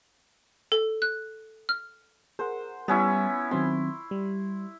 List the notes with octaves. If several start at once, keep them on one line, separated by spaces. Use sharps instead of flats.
A4
F#6
F6
G#4 A#4 C5 F#5
G3 B3 C#4 E4
D#3 F#3 C4 C6
G3